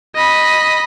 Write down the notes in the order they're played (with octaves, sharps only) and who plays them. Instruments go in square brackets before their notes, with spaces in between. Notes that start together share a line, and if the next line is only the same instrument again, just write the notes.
[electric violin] D#5 B5